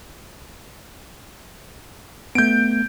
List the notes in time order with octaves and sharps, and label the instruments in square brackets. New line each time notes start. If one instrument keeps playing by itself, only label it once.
[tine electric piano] A3 B3 [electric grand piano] G6 D7